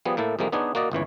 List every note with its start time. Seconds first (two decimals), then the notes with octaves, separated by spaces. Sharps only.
0.05 F3 G3 B3 G#4
0.17 A2 A#3 E4 A4
0.39 C2 F2 C3 G#3 A#3
0.52 B3 D4 D#4 G#4 C#5
0.75 A#3 F#4 D5 D#5
0.92 G1 C#2 E3 C#5